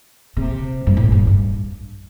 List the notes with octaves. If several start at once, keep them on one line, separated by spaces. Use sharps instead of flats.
C3
G2
A2
G2
G2